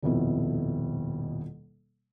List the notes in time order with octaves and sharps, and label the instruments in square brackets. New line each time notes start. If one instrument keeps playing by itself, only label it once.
[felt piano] D#1 F2 B2 E4